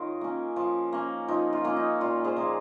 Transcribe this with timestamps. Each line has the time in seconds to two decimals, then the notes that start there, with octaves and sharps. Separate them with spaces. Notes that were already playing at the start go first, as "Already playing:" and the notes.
Already playing: D#3 D#4 F4 A#4 C#5
0.21 A#3 C#4
0.56 F3
0.92 A#3 C#4
1.28 F3 D#4
1.53 F4
1.64 A#3 C#4
1.77 D#4
2.01 A#2 F4
2.24 G#4 C5
2.36 F3 A#3